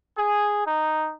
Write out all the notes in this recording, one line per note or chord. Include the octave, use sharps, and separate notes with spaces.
G#4
D#4